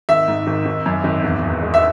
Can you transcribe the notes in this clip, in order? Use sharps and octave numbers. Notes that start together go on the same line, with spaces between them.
G#1 E5
G#2
G#1
G#1
F#2
G#1
E1
E2
G#3
E5